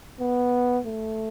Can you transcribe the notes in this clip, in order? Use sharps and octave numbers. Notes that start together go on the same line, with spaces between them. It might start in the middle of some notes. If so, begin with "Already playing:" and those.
B3
A3